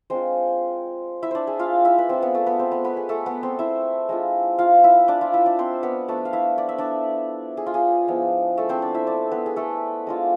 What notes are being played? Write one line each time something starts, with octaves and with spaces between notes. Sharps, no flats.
G#3 C4 D4 F4 C5
E4 E5
D4 C5 D5
G#4
F4 F5
E4 E5
B4
G#3 C4 D4 F4 C5
B3 B4
A3 A4
B3 B4
C4 C5
B3 B4
B3 B4
G#4
A3 A4
B3 B4
C4 C5
E4 E5
G#3 D4 F4
F4 F5
E4 E5
D4 D5
F4 F5
E4 E5
D4 D5
C4 C5
B3 B4
F3 A3 B3 D4 A4
F5
E4 E5
D5
E5
D4 D5
G#4
F4
G#4
F3 G#3 B3 E4
A3 A4
C4 C5
D4 D5
E4 E5
D4 D5
B3 B4
G#4
A3 A4
G#3 D4 F4